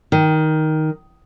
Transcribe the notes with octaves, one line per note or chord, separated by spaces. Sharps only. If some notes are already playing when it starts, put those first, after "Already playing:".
D#3